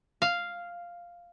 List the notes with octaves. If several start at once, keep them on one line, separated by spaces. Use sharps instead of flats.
F5